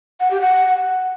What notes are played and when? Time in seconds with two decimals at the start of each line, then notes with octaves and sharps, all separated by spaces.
0.20 F#5
0.31 G4
0.41 F#5